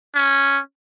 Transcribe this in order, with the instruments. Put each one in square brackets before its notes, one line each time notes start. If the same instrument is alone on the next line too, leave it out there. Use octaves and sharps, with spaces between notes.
[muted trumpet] C#4